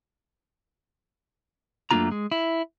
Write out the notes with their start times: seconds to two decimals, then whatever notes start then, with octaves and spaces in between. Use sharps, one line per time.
1.91 F#2 A3 A#3 D4 F4 A#5
2.11 G#3
2.32 E4